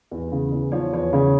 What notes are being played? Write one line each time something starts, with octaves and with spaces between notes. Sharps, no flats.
E2
C#3
E2
F3 C#5
E2 C#5
C#3 C#5